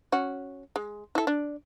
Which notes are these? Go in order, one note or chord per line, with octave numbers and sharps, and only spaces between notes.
C#4 F#4
G#3
E4 A4
D4